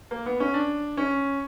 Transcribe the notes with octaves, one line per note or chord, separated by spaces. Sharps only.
A#3
B3
C#4
D4
C#4